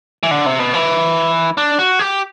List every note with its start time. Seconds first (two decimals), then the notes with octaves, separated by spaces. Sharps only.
0.23 E3
0.31 D3
0.46 C3
0.59 B2
0.74 E3
1.57 D4
1.79 F#4
1.99 G4